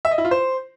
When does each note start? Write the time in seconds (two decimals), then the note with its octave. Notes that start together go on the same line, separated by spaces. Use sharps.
0.05 E5
0.11 D#5
0.18 E4
0.25 F4
0.31 C5